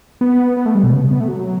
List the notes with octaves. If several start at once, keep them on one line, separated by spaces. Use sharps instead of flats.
B3
B3
A3
G3
B2
C#3
B3
A3
F#3